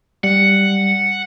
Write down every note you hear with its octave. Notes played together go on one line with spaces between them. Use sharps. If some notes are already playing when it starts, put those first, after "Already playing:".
G3 F#5